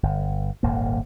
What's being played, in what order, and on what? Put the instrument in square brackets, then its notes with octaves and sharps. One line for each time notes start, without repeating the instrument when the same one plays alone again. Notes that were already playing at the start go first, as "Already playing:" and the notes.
[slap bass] G1
D#1 G#1 A#3